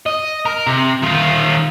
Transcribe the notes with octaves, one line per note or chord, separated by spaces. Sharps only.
D#5
A#4
C3
D#3 F4